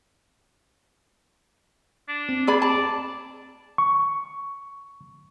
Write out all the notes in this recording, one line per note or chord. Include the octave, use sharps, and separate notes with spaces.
D4
C4
G#4 D5 B5
D5 A5
C#6